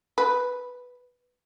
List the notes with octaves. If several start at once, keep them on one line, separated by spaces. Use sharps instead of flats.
B4